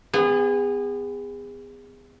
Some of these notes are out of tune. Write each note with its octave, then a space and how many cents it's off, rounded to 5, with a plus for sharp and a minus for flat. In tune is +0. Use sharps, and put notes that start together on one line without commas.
B3 +30 G#4 -30